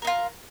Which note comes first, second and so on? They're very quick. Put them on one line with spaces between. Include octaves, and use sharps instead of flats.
A#4 D#4 F4